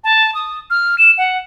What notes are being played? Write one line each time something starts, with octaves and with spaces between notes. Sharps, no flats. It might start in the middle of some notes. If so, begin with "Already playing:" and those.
A5
D#6
F6
E7
F#5